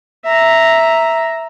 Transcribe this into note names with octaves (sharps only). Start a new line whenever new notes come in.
E5 A#5